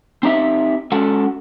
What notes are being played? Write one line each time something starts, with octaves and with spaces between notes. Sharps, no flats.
C4 D#4 G4 E5
G#3 C#4 F#4 A4 F#5